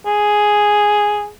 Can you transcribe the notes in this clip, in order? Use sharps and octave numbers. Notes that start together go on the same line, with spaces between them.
G#4